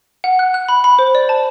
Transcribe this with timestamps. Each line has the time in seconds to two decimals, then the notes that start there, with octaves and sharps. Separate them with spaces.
0.24 F#5
0.39 F#6
0.54 F#6
0.68 B5
0.84 B5
0.99 C5
1.15 D5
1.29 A5